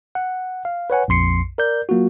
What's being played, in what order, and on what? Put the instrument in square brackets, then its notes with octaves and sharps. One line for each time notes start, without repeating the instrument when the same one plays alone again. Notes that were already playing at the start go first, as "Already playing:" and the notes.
[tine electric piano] F#5
F5
B4 C#5 F#5 G#5
A#1 F2 C6 C7 C#7
A#4 D5 G6
F#3 A#3 F4 F#4